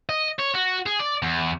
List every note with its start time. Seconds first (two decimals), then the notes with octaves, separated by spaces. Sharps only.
0.09 D#5
0.39 C#5
0.54 F#4
0.86 G#4
0.99 D5
1.23 E2